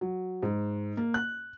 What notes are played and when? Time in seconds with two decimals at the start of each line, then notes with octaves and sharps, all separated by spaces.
0.01 F#3
0.43 G#2
0.97 A#3
1.14 F#6